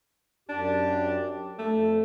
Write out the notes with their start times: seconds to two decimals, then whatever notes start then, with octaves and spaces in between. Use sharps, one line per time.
0.49 F#2 D4 G4
1.59 F2 A3